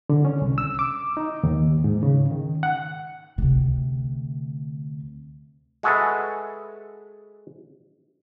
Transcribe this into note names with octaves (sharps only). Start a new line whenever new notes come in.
D3
C#4
C2
E6
D6
D#4
D#2
G#2
C#3
D#3
F#5
D2 C3
G#3 F#4 G#4 A4 B4 E5